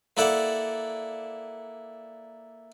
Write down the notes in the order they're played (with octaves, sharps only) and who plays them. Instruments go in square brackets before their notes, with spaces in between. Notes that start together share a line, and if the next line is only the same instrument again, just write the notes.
[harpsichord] A#3 E4 A4 D5 F#5 A5